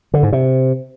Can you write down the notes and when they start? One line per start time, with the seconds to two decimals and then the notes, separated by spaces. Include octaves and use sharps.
0.14 D3
0.23 G#2
0.32 C3